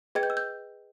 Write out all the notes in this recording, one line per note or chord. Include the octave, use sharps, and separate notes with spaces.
G#4 B4 D#5 G5 G#6
G6
E6
G6